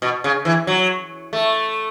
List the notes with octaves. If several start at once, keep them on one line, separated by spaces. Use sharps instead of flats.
B2
C#3
E3
F#3
A3